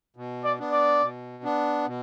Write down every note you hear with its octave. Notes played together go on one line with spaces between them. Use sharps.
B2
D5
B3 D4
D5
B2
B3 D4
B2